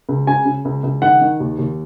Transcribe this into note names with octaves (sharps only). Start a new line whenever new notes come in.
C#2
C#3 G#5
C#3
C#2
C#2
D#3 F#5
D#3
D#2
D#2